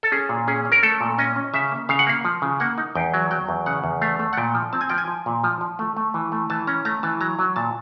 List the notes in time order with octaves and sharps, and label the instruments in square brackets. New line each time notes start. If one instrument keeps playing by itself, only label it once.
[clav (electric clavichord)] A4
C#4 G#4
A#2
C#4 G#4
C#4
A#4
A3 A4
A#2
C#4 D#5
C#4
C#3 E5
A#3
C#3 F5
F#5
A#3 F5
F3
C#3
A#3 F#5
D#4
E2 G5
F#3
F#3 G5
E2
C#3 F#5
E2
A3 F5
A3
F#5
A#2 G5
F3
C4 A5
G#5
F3 G5
G#5
F3
A#2
F3
F3
A3
A3
E3
A3
E3 A5
C#4 A#5
A3 A#5
E3 A5
F#3 A#5
F#3
A#2 A5